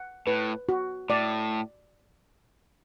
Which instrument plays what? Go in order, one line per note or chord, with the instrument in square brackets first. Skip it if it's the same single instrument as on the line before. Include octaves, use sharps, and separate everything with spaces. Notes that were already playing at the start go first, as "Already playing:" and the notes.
Already playing: [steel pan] F#5
[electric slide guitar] A2 [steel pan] B4
[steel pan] F#4
[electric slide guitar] A2 [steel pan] D5